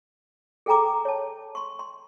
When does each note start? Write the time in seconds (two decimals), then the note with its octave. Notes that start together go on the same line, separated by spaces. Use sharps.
0.66 G#4 A4 G5 G#5 A#5 D6
1.05 C#5 A5
1.55 C6 C#6
1.79 C6